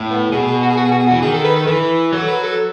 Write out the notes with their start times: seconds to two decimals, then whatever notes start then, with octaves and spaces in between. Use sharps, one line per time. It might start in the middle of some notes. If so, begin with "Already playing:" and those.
Already playing: A2
0.11 B3
0.32 B2 G#4
0.48 G#4
0.63 F#4
0.70 G#4
0.77 F#4
0.85 G#4
0.92 F#4
1.00 G#4
1.07 E3 F#4
1.23 D#3 G#4
1.34 A4
1.45 B4
1.56 A4
1.67 E3 B4
2.13 F#3 A4
2.28 B4
2.43 A4